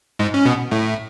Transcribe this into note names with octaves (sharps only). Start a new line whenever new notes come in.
G#2 G#3
C#4
B2 B3
A2 A3